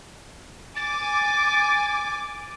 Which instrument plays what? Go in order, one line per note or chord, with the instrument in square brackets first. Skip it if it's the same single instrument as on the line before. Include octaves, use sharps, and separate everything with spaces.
[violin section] G#5 D6 [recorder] A6